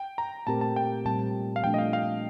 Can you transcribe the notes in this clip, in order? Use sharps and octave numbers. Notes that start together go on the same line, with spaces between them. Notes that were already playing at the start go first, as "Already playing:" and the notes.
Already playing: G5
A#5
A#2 A3 C4 G4 A#4 A5
A5
G5
A#2 G3 C4 A5
F5
F3 A3 D4 G5
D#5
F5
F5